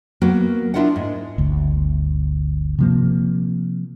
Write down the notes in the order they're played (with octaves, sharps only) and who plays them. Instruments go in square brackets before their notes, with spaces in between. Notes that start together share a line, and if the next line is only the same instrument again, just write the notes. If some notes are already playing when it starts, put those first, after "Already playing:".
[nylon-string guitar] F#3 A#3 B3 F#4 A#4 B4
B3 D4 E4 F4 A#4 F#5
G#2
[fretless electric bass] G1 D2
C3 F3 A#3